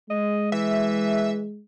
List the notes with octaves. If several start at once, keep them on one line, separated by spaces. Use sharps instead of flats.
G#3 D#5
E3 E5